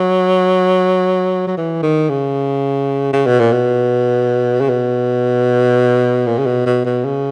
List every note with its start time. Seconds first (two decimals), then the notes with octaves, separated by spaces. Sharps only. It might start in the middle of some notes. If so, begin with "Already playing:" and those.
Already playing: F#3
1.47 F#3
1.57 E3
1.82 D#3
2.09 C#3
3.13 C#3
3.26 B2
3.39 A#2
3.52 B2
4.60 C#3
4.69 B2
6.26 A#2
6.38 C#3
6.46 B2
6.66 B2
6.85 B2
7.05 C#3